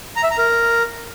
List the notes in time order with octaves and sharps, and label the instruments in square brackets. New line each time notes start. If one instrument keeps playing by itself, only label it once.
[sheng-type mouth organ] A#5
E5
A#5
A#4